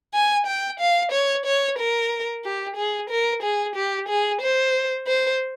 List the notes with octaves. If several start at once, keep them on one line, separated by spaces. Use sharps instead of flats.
G#5
G5
F5
C#5
C#5
A#4
G4
G#4
A#4
G#4
G4
G#4
C5
C5